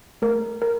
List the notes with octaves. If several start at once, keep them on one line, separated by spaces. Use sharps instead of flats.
A3 A#4
A#4